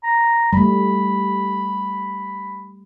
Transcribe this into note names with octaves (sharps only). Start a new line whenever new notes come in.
A#5
G3 A3 B5